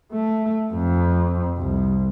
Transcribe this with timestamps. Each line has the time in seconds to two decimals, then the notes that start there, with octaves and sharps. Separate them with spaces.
0.12 A3
0.73 F2
1.58 C2